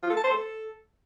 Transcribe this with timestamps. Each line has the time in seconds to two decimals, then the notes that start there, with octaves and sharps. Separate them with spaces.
0.03 F4
0.10 A4
0.17 A5
0.24 C5
0.31 A4